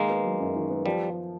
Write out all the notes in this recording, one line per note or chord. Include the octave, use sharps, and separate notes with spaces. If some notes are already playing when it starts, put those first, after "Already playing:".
Already playing: D#3 G#3 A#3
B3
F#3
F#2
D#3
B3
F3 G3